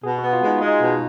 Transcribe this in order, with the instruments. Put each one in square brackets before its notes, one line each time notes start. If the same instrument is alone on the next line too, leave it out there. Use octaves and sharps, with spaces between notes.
[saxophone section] B2 [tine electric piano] G#4
[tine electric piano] F#4
[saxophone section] B3
[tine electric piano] F4
[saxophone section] G#3
[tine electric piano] D#4
[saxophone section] G#3 [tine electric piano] F4
[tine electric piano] D#4
[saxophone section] B2